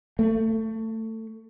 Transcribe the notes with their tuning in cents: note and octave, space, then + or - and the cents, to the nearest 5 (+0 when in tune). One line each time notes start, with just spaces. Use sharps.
A3 +20